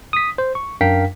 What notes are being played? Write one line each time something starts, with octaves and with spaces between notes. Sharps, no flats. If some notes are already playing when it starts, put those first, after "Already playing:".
D#6 B6
C5
C#6
F#2 D4 A#4 F5 G5 B6